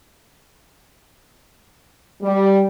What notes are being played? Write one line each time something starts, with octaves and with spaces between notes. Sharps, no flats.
G3